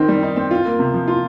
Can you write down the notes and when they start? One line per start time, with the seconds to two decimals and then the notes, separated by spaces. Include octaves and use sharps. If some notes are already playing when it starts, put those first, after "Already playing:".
Already playing: D#3 C4 D#4
0.08 G3
0.23 D#4
0.36 C4
0.51 F4
0.65 A#3
0.79 C3
0.94 F3
1.08 F4